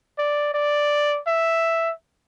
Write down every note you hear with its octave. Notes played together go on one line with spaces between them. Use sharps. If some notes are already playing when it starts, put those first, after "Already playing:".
D5
D5
E5